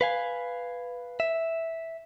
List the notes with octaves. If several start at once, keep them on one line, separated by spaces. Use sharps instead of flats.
B4 F5 G#5
E5